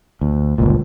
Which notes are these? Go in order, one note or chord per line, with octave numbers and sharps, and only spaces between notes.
D2
G1 C#2 A#2